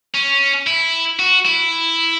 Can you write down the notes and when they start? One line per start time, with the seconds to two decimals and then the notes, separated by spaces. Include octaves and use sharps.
0.14 C#4
0.67 E4
1.19 F#4
1.45 E4